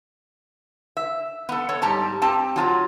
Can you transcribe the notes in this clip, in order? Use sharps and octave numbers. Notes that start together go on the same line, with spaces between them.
E5
B3 A4
A4 C#5
G#2 G3 G4 A5 A#5
C4 G4 G5 A5
F#3 F4 A5 A#5